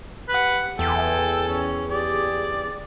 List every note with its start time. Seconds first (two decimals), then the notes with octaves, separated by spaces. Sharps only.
0.29 G4 B4 F#5
0.79 E2 A4 G5 G#5
1.48 C#4
1.91 G4 G#4 D5